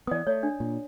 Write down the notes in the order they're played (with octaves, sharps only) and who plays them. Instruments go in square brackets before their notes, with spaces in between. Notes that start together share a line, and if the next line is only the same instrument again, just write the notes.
[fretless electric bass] E3 B3 [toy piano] D5 D#6
[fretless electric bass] A3 [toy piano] C#5
[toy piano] D4
[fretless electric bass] A#2